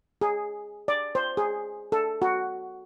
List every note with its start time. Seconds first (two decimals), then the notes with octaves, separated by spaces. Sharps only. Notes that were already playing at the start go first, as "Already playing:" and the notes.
0.21 G#4
0.88 D5
1.15 C5
1.37 G#4
1.92 A4
2.22 F#4